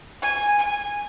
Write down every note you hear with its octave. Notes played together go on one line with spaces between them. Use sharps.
G#5
G#5